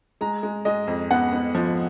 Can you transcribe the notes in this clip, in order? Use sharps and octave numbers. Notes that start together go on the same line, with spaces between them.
G#3 A#5
G#3
G#3 D#5
F2
B3 F#5
B3
F3